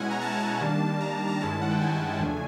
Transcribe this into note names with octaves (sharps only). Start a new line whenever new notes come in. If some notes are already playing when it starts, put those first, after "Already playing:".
Already playing: B2 G#3 C#4 E4 F#5 G#5
A#5
A5
A#5
A5
D#3 G3 A#3 D4
A#5
A#5
G2 D#3 G#3 C#4 E4 A5
F#5
G5
G#5
E2 C#3 F3 A3 D4